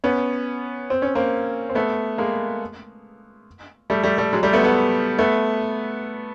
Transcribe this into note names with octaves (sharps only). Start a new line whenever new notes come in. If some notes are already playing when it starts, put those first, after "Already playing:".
B3 C#4
C4
C#4
A#3 C4
C4
A3 B3
G#3 A#3
G3 A3
G3 A3
G3 A3
F#3 G#3
G3 A3
A3 B3
A3 B3
A3 B3